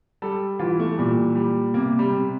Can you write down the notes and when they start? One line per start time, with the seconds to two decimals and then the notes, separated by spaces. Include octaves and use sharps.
0.22 G3 A4
0.59 E3 F4
0.79 A3
0.97 A#2 G3
1.35 G3
1.74 C3 A#3
1.99 G3
2.11 C3